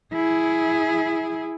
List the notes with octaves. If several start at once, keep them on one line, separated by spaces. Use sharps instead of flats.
E4 G#4